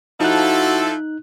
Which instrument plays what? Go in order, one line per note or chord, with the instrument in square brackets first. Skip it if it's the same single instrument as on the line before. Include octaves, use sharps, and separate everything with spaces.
[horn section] F3 E4 A4 [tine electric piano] D#4 F#6 [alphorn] F#4